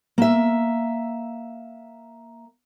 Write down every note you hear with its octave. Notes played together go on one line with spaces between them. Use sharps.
A#3 E5